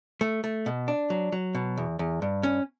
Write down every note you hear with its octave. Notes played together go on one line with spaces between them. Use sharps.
A3
A3
B2
D4
F#3
F#3
B2
E2
E2
G2
C#4